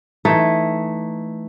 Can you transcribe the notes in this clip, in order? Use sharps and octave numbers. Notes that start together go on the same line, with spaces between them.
E3 A3 D#4